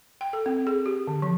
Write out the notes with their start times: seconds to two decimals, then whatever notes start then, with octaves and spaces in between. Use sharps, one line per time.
0.21 G5
0.33 A4
0.46 C4
0.67 G#4
0.86 G4
1.07 D3
1.22 F3